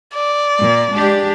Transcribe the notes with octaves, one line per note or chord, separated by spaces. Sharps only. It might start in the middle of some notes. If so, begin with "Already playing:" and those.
D5
A#2 A#3
G#3 D4 G4